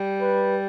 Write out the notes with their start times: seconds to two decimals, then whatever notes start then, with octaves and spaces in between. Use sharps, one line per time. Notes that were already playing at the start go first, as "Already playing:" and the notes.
Already playing: G3
0.22 B4